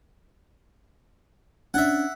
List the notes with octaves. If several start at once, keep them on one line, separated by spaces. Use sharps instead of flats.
C#4 D4 E5 F#5